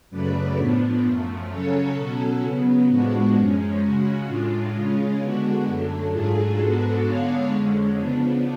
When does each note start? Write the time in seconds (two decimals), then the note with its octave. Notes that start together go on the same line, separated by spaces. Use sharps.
0.10 F#2 C#3 F#3 A3 B4 D5
0.57 A2 F3 B3 D4
1.03 F#2 F3 A3
1.49 C#3 F#3 C#4 A4 C#5
1.95 B2 F#3 C#4 F#4 A4
2.42 C#3 F#3 B3
2.88 A2 F3 G#3 B3 D4 F#4
3.35 F#2 F3 G#3 C#4
3.80 C#3 G#3 C#4 F#4
4.27 A2 G#3 D4 F4
4.73 C#3 G#3 C#4 F4
5.19 D3 G#3 B3 D4 F#4
5.65 F#2 D3 F#3 A3 D4
6.12 G#2 F#3 A3 D4 F4 G#4
6.58 G#2 G#3 B3 D4 F#4 A4
7.04 D3 G#3 B3 D4 C#5 F5
7.51 F2 D3 G#3 C#4
7.97 C#3 F3 B3 D4